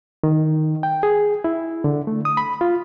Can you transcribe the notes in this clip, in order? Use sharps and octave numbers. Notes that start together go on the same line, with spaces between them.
D#3
G5
G#4
E4
D3
A3
D#6
B5
F4